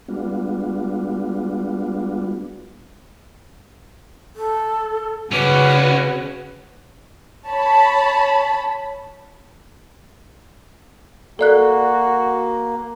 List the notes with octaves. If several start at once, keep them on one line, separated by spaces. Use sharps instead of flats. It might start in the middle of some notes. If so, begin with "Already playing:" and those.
G3 G#3 B3 D4 F4 F#4
A4
C#3 C#4 F#4 B4 D5
C#5 A5 B5
A#3 F#4 A4 D5 F#6